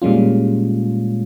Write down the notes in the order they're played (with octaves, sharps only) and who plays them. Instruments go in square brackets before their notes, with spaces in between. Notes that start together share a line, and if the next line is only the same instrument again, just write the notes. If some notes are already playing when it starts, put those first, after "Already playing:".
[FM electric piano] A#2 G3 G#3 C#4 F4